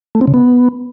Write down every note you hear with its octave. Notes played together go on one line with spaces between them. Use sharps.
A3
C4
C#3
B3